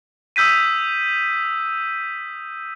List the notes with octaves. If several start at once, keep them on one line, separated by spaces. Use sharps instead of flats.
D#6 E6 G6 B6 D#7